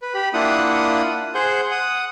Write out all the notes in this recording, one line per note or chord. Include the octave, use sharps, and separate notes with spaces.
B4
G4 B5
A#3 D4 E4 F4 F#5 D#6
G#4 C5 F#5 G6
F#5 D#6